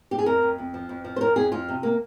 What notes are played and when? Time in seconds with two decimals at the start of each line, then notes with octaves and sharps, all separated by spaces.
0.11 G4
0.18 G#4
0.26 F2 A#4
0.42 F2
0.58 F2
0.74 F3
0.89 F2
1.04 F3
1.16 C5
1.21 F2 A#4
1.36 F2 G#4
1.52 F2 F4
1.69 C3
1.83 A#3